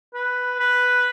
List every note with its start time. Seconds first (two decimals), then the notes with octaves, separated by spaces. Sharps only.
0.14 B4
0.60 B4